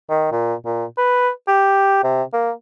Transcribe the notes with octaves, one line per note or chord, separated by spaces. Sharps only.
D#3
A#2
A#2
B4
G4
C3
A#3